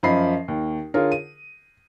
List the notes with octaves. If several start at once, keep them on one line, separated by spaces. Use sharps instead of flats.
F#2 F3 D#5 B5 C7
D#2
D3 F4 G#4 A#4 C#5
D#7